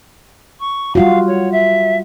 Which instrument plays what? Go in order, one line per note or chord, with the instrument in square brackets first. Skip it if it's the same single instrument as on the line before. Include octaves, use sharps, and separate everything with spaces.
[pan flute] C#6
[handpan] G3 F4 F#4 [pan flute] F5
[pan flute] C#5
E5